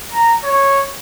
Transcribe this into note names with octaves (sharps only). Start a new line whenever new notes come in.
A#5
C#5